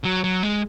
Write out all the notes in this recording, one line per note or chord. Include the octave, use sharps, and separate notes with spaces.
F#3
F#3
G#3